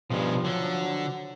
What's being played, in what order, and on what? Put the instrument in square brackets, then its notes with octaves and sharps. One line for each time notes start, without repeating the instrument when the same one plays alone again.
[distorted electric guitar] B1 G#3 [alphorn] G2 [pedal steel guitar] F3
[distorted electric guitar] D3 [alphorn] F#3